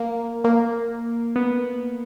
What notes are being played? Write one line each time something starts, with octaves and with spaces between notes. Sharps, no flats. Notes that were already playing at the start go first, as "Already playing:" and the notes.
Already playing: A#3
A#3
B3